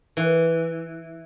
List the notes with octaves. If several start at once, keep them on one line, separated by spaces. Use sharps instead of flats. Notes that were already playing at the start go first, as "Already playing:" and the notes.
E3